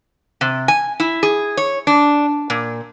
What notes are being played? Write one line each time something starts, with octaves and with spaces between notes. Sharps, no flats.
C3
G#5
E4
G#4
C#5
D4
A#2